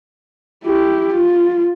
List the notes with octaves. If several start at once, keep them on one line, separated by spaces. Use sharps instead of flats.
E4 G4
F4